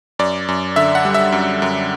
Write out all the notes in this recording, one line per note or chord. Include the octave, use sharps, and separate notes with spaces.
F#2 D5
F#2
D3 E5
F#5
G3
E5
F#2
F#2